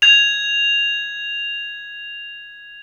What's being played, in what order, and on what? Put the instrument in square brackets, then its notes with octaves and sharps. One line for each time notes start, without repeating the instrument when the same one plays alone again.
[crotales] G#6 F7